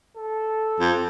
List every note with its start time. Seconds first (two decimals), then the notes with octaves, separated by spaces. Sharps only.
0.16 A4
0.80 F2